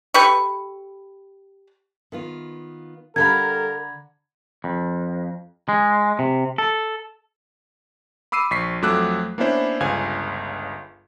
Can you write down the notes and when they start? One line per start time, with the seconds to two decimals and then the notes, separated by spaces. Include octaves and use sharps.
0.14 G4 A4 B4 C#6
2.12 D#3 B3 F4
3.16 D3 G3 A4 A#4 F5 A#5 B5 G#6
4.64 F2
5.69 G#3
6.19 C3
6.58 A4
8.32 B5 D6 E6 C7 D#7
8.51 A#1 C#6 B6 C7
8.82 F2 F#3 A3 D6 E6 F#6
9.38 A#3 B3 C#4 D4 E4 C5
9.80 G1 C#2 F5 G#5 G#6